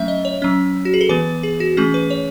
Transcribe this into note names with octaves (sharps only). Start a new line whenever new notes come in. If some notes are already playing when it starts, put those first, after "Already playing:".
Already playing: F#3 A3 C#4 E5
D#5
C#5
F#3 C#4
F#4
G#4
A4
E3 B3 B4
G#4
F#4
E3 A3 C#4 G#4
B4
C#5